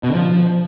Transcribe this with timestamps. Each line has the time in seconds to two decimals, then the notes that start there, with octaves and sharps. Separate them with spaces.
0.03 B2
0.09 D3
0.15 F3